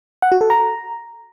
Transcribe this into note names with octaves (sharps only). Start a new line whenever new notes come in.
F#5
F#4
A4
A#5